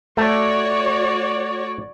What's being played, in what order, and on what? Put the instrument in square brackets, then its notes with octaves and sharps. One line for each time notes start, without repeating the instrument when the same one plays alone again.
[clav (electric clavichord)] A3 A5 [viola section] F#4 C#5 D5